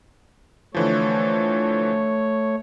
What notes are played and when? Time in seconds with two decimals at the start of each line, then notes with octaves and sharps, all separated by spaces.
0.74 D3 E3 F3 A3 C#5